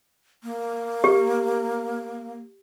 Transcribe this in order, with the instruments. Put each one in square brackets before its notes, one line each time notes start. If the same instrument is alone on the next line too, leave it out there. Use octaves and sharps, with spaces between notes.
[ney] A#3
[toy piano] G4